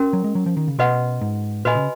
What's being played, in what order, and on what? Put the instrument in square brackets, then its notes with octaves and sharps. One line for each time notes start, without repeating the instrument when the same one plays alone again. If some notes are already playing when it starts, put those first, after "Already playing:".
Already playing: [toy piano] C#4 F#4 A#4
[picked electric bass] F#3
G#3
F#3
F3
D#3
C#3
[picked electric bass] B2 [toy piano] F#4 B4 D#5 F#5
[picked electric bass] G#2
[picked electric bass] A#2 [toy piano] F#4 B4 D#5 G#5 B5
[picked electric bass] C#3